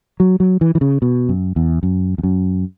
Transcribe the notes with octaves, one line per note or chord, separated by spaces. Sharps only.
F#3
F#3
E3
E3
C#3
B2
F#2
E2
F#2
E2
F#2